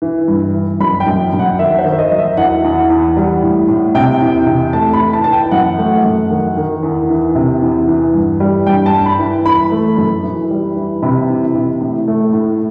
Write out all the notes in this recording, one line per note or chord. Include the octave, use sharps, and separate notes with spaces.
E3
G2
E3
F#2 B5
G5
F#2
F#2
F#5
D#3 E5
C5
D#3
E5
D#5
F#3
E5
E2 F#5
E2
E2
G3
A2
A2
C3 G5
E2
C3
A3 A5
B5
E3
A5
E3 A5
G5
F#2 F#5
A3
F#2
D#3
D#3
E2
E3
C3
E2
E3
G2
G3
G2 G5
A5
G2
B5
E3
E3 B5
A3
F#2
E3
G3
E3
C3 B5
E3
C3
A2
A3
A2